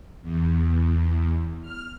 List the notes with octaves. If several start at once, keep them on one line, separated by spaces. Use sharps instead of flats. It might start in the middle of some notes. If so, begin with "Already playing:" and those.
E2
F6